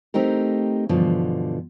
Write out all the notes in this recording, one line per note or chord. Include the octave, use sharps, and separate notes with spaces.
A3 C4 D#4 G4 A#4
G2 B2 D3 E3 F3